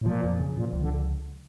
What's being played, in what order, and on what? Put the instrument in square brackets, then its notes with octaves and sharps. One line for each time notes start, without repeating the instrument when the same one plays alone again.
[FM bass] A2
[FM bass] A#2 [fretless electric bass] F3
[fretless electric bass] F2
C#3
[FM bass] A#2 [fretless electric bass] F3
[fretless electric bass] C#2
[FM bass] D3